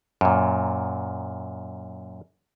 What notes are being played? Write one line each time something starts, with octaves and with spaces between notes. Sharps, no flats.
F#2 A#2